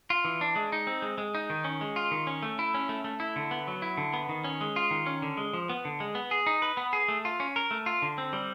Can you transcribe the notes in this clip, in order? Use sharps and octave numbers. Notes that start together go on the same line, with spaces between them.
F4
E3
D4
G#3
D#4
C4
G#3
G#3
D#4
D#3
C#4
G#3
F4
D#3
C#4
A3
E4
C#4
A3
A3
E4
D3
B3
F#3
E4
D3
B3
D#3
C#4
G#3
F4
D#3
C#4
D3
G#3
F3
B3
D3
G#3
B3
G#4
D#4
B4
B3
G#4
A3
F4
C#4
A#4
A3
F4
D3
C4
G3